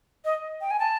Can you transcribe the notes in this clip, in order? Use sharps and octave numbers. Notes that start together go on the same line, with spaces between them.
D#5
G5
G#5
A5